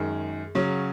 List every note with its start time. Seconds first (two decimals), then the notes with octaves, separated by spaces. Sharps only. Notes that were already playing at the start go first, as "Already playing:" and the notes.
Already playing: F#2 D#3 G#3 G#4
0.55 C#3 F#3 C#4 G#4